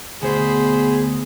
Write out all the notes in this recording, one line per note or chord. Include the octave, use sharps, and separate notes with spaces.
D2 B2 G#4 C5 B5